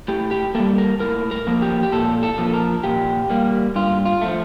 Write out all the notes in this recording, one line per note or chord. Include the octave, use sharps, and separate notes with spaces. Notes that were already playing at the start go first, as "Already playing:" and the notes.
A2 G4
G4
G3 A#3 A4
A#4
A2 A#4
A#4
F3 A#3
G4
G4
A#2 A4
A4
F3 A#3
A#4
A#2 G4
G3 A#3
G2 F4
F4
F3 A3